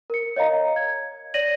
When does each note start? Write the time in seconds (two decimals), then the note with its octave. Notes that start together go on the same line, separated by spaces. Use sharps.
0.10 A#4 C#7
0.36 C#5 D#5 F5 A#5
0.76 G#6
1.34 C#5 D5 A#6 D#7 F#7